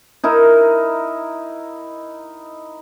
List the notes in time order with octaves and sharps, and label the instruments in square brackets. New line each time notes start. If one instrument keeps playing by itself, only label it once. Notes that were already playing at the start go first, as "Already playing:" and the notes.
[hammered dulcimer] D#4 E4 A#4